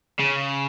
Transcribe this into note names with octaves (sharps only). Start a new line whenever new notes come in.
C#3